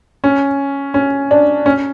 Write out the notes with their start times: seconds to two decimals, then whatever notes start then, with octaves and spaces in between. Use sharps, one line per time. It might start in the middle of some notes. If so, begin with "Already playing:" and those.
0.24 C#4
0.94 C#4
1.31 D4
1.66 C#4